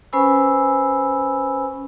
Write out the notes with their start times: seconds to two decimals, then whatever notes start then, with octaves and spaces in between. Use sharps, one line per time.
0.13 C#4 B4 C5 G#5 B5 E6